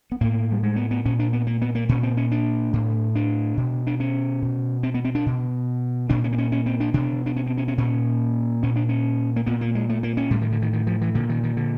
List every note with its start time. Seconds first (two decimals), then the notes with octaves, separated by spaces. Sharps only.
0.12 B3
0.21 A2 A#3
0.52 G3
0.63 G#3
0.76 B3
0.91 B3
1.05 A#2 C#4
1.19 D4
1.33 B3
1.47 A#3
1.62 B3
1.75 A#3
1.89 A#2 C#4
2.03 C4
2.17 C#4
2.31 D4
2.73 A2
3.15 D4
3.57 B2
3.87 D4
4.00 C#4
4.42 B2
4.83 C4
4.94 B3
5.05 C4
5.15 D4
5.26 B2
6.09 A#2 D4
6.24 C#4
6.33 C4
6.38 C#4
6.52 C#4
6.66 C4
6.80 D4
6.94 B2 D4
7.26 D4
7.36 C#4
7.47 C4
7.57 C#4
7.68 C#4
7.78 A#2 C#4
8.63 A#2 C#4
8.76 D4
8.89 C#4
9.36 A#3
9.46 A#2 B3
9.61 A#3
9.75 G#3
9.90 A3
10.03 A#3
10.17 C#4
10.31 A2 G3
10.42 D#3
10.52 D3
10.62 D#3
10.73 D#3
10.87 F3
11.01 E3
11.15 A#2 D3
11.29 D#3
11.43 D#3
11.57 D3